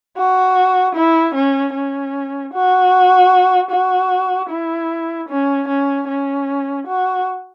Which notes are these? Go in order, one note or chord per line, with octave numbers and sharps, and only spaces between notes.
F#4
E4
C#4
C#4
F#4
F#4
E4
C#4
C#4
C#4
F#4